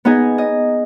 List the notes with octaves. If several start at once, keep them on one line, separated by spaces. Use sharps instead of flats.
B3 D#4 G#4 D#5
D#5